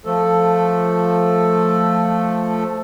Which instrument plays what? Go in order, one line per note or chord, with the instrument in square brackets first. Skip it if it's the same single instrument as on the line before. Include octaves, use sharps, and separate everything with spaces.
[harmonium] F3 A3 A4